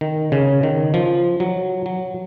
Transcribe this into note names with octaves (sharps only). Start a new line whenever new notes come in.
D#3
C#3
D#3
F3
F#3
F#3